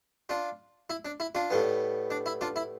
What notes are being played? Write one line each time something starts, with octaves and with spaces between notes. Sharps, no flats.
D4 F4
E4
D4
E4
D4 F4
A2 G3 B3
D4
E4
D4 F4
E4